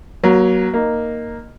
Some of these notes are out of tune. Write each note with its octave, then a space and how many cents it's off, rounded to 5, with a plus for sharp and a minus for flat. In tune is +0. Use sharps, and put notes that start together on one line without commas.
F#3 +10 A#3 +35
A#3 +0 D#4 -5